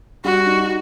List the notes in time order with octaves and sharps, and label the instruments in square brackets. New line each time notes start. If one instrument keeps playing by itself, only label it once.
[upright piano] G3 [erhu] F#4
[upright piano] D#4